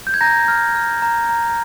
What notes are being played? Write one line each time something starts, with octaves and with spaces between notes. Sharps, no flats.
G6
G#6
A#5 G6 A#6
F6
F6
A#5
A#5